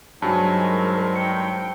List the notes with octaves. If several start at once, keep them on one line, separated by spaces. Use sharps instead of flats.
G2 F#3 G#3 D#4 C5 G#5 A5
A#4
G5 C#7